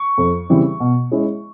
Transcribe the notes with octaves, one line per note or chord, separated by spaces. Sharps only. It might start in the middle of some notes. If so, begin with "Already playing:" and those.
Already playing: C#6
F2
C#3 E3 G3 C4
B2
G#3 C#4 E4